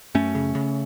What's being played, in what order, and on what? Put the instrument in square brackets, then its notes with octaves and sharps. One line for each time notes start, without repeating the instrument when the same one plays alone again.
[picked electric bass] F#2 A3 C#4
C#3
C#3